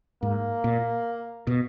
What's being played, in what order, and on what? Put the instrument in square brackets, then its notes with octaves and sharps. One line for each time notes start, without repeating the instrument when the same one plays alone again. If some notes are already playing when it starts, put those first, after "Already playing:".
[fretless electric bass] G#2 [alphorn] A#3
[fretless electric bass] A#2
B2